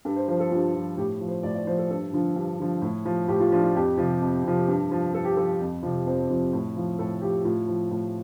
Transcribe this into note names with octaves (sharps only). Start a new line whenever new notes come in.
G2 A4
C5
F3 C5
A4
G2 F4
F3
A2 G4
F3
C5
A2 D5
D5
F3 C5
A4
G2 A4
D3 F3
G2
D3 F3
A2
F3
A2 G4
F4
F3 D4
F4
F2 G4
C3 F3
F2
C3 F3
G2
F3
G2 A4
G4
F3 A4
F2
C3 F3
F2 C5
C3 F3
A2
F3
A2 A4
F3 G4
A2 F4
F3
A2